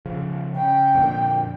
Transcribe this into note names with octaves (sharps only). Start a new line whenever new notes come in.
C#3 F3
C#3 G5
F2 A#2 D3